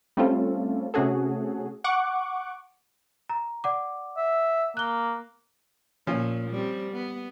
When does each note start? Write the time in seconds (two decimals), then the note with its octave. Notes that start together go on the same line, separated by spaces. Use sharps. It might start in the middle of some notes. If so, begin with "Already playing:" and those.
0.17 G3 A3 C4 C#4 F4 A4
0.94 C3 A3 C#4 F#4 G#4 A4
1.84 F#5 C#6 D6
3.29 A#5
3.64 D5 F#5 D6
4.17 E5
4.77 A#3 F#6 G7
6.07 A#2 F3 C#4 F4
6.50 G3 C4
6.92 B3